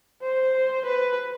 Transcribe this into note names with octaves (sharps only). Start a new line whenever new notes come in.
C5
B4